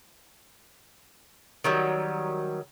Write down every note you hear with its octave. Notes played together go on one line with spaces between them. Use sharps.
D#3 F#3 G3